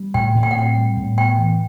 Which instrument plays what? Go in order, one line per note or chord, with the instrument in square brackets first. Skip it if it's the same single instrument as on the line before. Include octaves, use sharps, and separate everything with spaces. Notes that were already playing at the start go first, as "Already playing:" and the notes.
Already playing: [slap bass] G3
[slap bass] A2 [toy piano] G5
[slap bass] A2
[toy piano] G5
F#5
[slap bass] C4 [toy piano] G5
[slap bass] G3
A2
[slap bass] B3 [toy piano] G5
[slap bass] E3